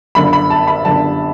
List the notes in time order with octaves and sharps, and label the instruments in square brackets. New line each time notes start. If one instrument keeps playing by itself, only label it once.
[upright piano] G1 F#2 D3 B5
B5
A5
B5
G1 F#2 D3 A5